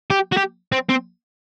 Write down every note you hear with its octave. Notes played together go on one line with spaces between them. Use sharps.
G4
F#4
G4
C4
C4